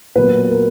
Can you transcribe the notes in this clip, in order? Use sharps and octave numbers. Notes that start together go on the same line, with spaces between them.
A#2 F#3 B3 B4
A#4